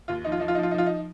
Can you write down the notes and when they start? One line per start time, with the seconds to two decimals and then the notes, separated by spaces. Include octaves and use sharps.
0.08 D#2 F4
0.24 F3 D#4
0.32 F4
0.40 F3 D#4
0.48 F4
0.55 D#4
0.58 F3 F4
0.71 D#4
0.74 F3 F4
0.86 D#4